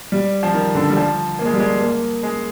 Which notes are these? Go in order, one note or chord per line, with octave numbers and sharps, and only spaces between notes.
G3
F3
D#3
D3
G3
F3
A#3
G#3
G3
G#3
A#3
G#3